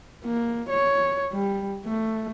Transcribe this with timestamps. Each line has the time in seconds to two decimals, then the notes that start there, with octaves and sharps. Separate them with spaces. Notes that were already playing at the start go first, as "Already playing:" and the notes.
0.24 A#3
0.70 C#5
1.32 G3
1.86 A3